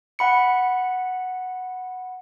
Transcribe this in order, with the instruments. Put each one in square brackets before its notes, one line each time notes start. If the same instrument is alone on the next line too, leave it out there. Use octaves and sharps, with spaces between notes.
[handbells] F#5 B5 C#7